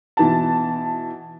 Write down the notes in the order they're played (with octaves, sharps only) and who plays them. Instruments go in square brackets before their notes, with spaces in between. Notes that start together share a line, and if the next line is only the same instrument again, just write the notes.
[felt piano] B2 E3 A5